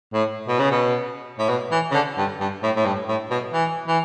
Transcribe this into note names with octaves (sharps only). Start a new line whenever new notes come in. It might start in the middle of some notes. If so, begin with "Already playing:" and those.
A2
B2
C#3
B2
A2
B2
E3
C#3
D3
G2
G2
A2
A2
G2
A2
B2
E3
E3